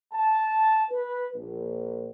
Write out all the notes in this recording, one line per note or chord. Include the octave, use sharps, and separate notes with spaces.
A5
B4
A#1